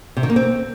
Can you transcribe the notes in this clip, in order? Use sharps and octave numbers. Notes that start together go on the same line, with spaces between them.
C3
D#3
A#3
C4